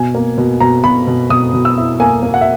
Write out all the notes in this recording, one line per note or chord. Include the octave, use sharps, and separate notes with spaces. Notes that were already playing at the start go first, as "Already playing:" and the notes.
Already playing: B2 G#5
A#3
B2
B2 A#5
B2 B5
B2
B2 D#6
B2
E6
E4
A#3 G#5
A#3
F#5
E5